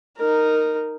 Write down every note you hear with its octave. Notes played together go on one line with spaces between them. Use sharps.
D#4 A#4